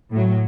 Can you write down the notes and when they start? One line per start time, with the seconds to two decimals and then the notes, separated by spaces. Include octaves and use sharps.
0.12 A2 F#3